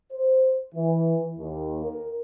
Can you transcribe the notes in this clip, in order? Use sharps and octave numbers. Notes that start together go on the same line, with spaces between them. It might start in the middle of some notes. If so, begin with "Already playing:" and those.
C5
E3
D#2
A#4